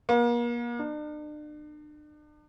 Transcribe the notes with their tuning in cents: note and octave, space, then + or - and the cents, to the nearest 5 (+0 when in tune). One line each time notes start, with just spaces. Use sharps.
A#3 +40
D4 +40